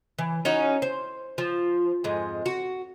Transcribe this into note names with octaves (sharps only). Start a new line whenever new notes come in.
E3
C#4 D#4 F#4
C5
F3
F2 G#2 G#3
F#4